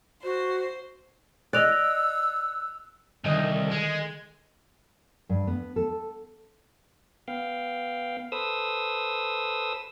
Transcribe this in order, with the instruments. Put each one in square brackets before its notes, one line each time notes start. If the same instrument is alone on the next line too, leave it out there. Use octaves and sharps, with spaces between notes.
[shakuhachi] F#4 [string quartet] C5
[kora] D5 D#5 [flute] E6 [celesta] F#6 F7
[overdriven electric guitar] C2 [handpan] D3 D#3 D#5
[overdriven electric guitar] G#3
[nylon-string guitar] G2
B3
A4
[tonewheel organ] B3 F5 G5
A4 B4 C5 D#6 E6